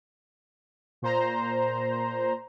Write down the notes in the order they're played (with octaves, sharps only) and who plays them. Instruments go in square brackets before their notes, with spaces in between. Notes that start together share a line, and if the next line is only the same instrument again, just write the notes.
[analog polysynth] A#2 C5 A#5